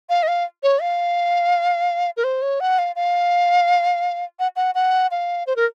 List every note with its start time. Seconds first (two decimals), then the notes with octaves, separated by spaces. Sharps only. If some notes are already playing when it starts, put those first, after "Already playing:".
0.09 F5
0.23 D#5
0.28 F5
0.63 C#5
0.81 F5
2.17 A#4
2.24 C5
2.42 C#5
2.60 F#5
2.79 F5
2.96 F5
4.39 F#5
4.56 F#5
4.75 F#5
5.11 F5
5.47 C5
5.56 A#4